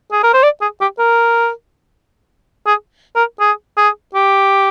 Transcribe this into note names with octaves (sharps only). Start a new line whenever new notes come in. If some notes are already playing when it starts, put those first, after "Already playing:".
G#4
A#4
C5
D5
G#4
G4
A#4
G#4
A#4
G#4
G#4
G4